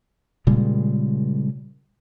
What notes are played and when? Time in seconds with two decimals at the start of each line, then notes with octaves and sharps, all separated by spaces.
0.47 A#2 C#3 G3 G#3